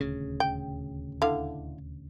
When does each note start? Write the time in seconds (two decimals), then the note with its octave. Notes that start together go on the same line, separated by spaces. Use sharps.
0.01 D#1 D2 C#3
0.40 G5
1.22 D3 E4 F5